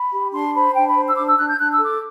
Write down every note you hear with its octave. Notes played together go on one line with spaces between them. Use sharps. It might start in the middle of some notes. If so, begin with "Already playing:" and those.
Already playing: B5
G4
D4 C6
C5 B5
D4 G5
B5
C5
E6
D4 D6
E6
D4 F#6
G6
D4 F#6
E6
A4
D6